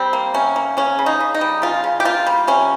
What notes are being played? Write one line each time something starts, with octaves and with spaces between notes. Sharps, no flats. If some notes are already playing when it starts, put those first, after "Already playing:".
Already playing: G3 C4
A#3
C3 C#4
A#3
C#3 C#4
C#3
D#4
C#3
D#4
G3
C#3 F4
C#3
G4
A#3 F4
G3
C3 C#4